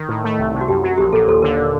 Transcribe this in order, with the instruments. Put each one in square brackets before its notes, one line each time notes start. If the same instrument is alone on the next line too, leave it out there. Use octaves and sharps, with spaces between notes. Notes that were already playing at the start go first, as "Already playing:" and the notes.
Already playing: [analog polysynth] D#3
A2
A3
C2
C3
[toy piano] F#4
[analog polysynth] F#2 [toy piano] G4
[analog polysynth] F#3
[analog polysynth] A#1 [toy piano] G4
[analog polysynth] A#2 [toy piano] A4
[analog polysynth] D#2 [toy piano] A4
[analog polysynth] D3 [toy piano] A#4